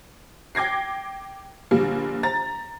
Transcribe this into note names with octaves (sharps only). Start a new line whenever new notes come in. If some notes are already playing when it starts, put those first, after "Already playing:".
G5 D6 G#6 A#6 C7
A#1 D3 G3 A#3
A#5 A6